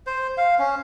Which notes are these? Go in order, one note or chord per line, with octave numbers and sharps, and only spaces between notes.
C5
F5
C#4